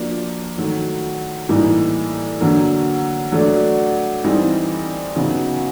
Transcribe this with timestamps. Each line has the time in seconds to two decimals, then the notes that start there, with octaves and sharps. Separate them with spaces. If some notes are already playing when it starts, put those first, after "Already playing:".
Already playing: F3 A#3 D4 F#4
0.57 D#3 F#3 A3
1.49 A2 E3 G3 A#3 D#4
2.40 D3 F#3 A#3
3.32 F#3 A3 D4
4.24 E3 G3 C4 D#4
5.16 C#3 F#3 B3 D#4 F#4